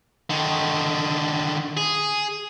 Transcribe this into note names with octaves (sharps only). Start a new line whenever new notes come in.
D3 D#3
G#4